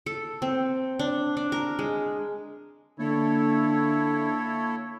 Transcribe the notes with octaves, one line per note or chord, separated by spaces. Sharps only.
A4
C4
D4
D4
A#4
G#3
D3 A#3 E4 A4 C#5